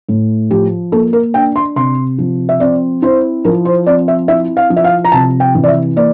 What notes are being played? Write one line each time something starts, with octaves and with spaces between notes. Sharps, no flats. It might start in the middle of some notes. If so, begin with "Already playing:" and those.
A2
F3 G4
A#3 A4
A#4
D4 G5
C6
C3 C6
F3
E5
C4 D5
E4 C5
F3 A#4
C5
C4 D5
E5
E4 E5
F5
F3
E5
F5
A#5
C3 A5
G5
E3
D5
E5
A#3 D5